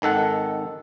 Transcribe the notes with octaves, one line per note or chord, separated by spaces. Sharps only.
G#1 D#3 A4 F#5